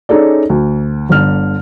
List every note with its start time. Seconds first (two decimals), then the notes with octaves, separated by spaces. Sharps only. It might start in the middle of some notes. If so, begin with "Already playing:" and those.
0.09 C#4 D#4 G#4 A4 D5
0.50 D2
1.09 G1 D3 F6